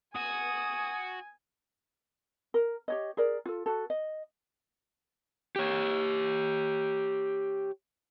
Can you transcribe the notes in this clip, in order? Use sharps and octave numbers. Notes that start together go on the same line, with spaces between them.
F#4 G#5 D#6
A#4
G4 C#5 D#5
G#4 A#4 D5
F4 A4
F#4 A4
D#5
G4 C#5